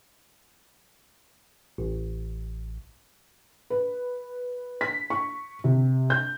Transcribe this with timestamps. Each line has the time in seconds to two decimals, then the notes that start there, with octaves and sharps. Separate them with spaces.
1.78 A1
3.70 B4
4.81 B6
5.10 C#6
5.64 C3
6.10 G6